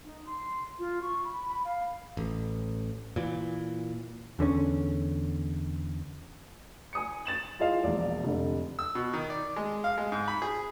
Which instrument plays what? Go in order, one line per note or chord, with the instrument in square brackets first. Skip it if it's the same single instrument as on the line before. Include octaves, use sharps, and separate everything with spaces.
[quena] D#4
C6
F4
C#6
B5
B5
F5
[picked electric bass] A1
A#2 E3
E2 D3 A#3 C#4
[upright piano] G#5 D#6 C#7
A6 E7 F#7
E4 F4 G#4 D#5 F5
E1 A#1 D5
F1 D3
[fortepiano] E6
B2
D#3
D5
G#3
F5
G#3
G#2
B5
G#4